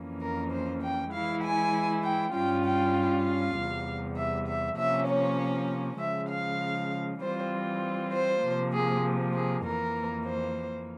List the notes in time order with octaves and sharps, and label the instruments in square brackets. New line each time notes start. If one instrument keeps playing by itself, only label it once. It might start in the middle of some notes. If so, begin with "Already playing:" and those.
Already playing: [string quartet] F2 E3 A#3 C#4
A#4
C5
G5
E3 G#3 E4 F5
G#5
G5
G2 G3 C#4 F4 G5
G5
F5
E2 C3 G3
E5
E5
C3 F3 A#3 C#4 E5
C#5
C#3 F3 G#3 E5
F5
E3 G3 C4 F4 C5
C5
C3 F3 A#3
G#4
G#4
F2 E3 A#3 A#4
C5